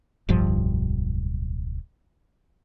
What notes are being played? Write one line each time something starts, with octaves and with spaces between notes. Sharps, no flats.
D1 B1 G2 F3